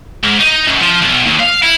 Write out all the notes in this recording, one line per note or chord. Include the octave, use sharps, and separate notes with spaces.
G#2
D#4
F#2
F3
B1
D#2
F5
E4